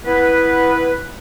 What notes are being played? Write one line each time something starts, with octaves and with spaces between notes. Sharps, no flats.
B3 E4 B4